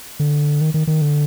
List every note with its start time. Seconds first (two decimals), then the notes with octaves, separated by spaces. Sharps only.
0.20 D3
0.61 D#3
0.74 D#3
0.87 D#3
1.01 D3